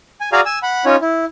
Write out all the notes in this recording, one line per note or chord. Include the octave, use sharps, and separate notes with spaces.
G#5
F#4 G#4 D5 F5 G#5 A#5
G#5 E6
F#5 B5
C#4 D#4 F4 C#5
E4